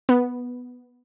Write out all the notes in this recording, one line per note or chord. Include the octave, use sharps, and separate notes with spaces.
B3